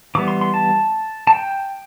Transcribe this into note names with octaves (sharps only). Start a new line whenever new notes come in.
E3 G3 B3 D6
C6
C6
A5
A5
G5